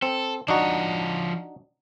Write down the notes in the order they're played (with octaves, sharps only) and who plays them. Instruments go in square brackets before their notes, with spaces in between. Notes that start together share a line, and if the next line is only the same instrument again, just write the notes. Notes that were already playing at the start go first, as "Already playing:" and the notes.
[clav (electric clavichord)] C4 [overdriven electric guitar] A4
[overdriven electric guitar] F3 C#5 [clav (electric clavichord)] D4 D#4 F#4